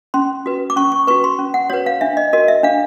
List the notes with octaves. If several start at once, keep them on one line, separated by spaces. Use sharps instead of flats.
C#4 C6
F#4 B4
D6
C#4 C#6
C#6
F#4 B4 C#6
C6
C#4
F#5
F#4 B4 C#5
F5
D4 E5
D#5
F#4 A#4 D#5
E5
D4 F5